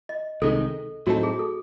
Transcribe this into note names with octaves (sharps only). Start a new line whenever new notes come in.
D#5
C2 C3 D#3 G#3 D#4 A4
A2 F#3 C4 D#4 F#4 A4
G#4
A4